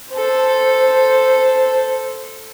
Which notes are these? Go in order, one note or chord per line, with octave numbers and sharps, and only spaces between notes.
A4 C5